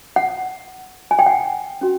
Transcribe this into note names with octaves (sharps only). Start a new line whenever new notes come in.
F#5
G#5
G5
F#5
C#4 F#4